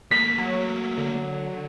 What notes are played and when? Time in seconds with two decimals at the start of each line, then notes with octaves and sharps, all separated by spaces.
0.11 A3 A#3 B6
0.38 F#3
0.97 D3